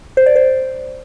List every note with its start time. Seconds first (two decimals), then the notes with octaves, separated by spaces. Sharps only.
0.17 C5
0.26 D5
0.36 C5